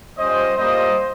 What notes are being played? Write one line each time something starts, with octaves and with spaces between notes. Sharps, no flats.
G3 C#4 F4 C5 D#5
G3 A#3 F4 C5 D#5